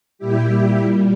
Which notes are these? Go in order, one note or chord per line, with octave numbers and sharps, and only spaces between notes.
A#2 G3 E4 G4